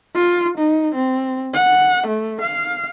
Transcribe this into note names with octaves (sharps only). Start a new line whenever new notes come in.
F4
D#4
C4
F#5
A3
F5